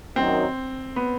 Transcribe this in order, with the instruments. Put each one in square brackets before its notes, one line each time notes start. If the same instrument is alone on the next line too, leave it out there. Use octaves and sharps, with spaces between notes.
[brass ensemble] F#2 D#3 F#3 [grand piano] C4
[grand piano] B3